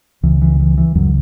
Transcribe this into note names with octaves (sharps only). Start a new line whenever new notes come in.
C#2 C#3 E3
E3
E3
E3
C#2 F#2 C#3 F#3